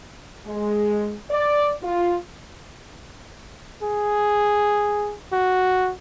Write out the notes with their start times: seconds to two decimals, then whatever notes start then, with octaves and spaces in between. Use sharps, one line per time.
0.47 G#3
1.31 D5
1.83 F4
3.83 G#4
5.33 F#4